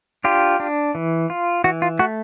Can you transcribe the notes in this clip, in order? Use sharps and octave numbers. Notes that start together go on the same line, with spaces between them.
D4 F4 G4
D4
E3
F4
E3 F#4
F4
A3 F#4